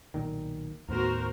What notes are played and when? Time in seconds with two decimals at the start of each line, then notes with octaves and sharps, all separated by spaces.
0.14 B1 A#2 D#3
0.88 D#2 A2 B3 F#4 A#4 C5